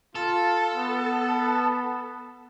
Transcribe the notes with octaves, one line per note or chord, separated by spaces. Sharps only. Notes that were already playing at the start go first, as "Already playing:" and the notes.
F4 A4
B3